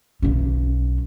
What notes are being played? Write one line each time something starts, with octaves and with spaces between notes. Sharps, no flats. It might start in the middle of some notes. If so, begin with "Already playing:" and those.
B1 C#4